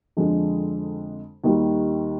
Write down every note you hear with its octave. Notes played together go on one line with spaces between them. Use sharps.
F2 D3 F3 G#3
D#2 D#3 G3